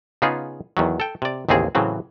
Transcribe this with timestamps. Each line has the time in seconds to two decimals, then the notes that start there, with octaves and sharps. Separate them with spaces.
0.22 C#3 B3 D#4 F4 G#4
0.77 E2 D#3 F#3
1.00 A4 G5
1.22 C3 D5
1.49 A1 D#2 C#3 C4 G#4
1.75 A2 C#3 E3 F#3 C4